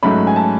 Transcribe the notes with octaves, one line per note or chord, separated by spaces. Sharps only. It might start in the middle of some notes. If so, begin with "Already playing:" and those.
G#2 F#3 A3 C#4 B5
G#5
A5